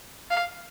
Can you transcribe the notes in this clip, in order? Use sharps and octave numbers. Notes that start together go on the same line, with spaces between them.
F5